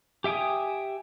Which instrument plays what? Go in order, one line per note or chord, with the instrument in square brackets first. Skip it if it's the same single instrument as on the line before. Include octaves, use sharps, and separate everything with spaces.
[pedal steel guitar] G4 E5 G5 G#5 D#6